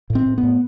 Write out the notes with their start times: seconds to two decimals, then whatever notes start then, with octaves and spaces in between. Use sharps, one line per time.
0.10 A2
0.15 C4
0.26 A2
0.38 B3
0.43 A2